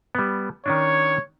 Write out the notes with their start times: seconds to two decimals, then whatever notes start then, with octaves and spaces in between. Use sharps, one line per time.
0.15 G3 B3
0.66 D#3 C#4 D4 C#5